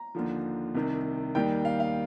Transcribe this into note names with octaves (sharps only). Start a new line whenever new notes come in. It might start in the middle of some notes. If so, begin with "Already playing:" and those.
Already playing: A#5
D#2 D3 F3
C2 C3 D#3
D#2 D#3 G3 G5
F5
F5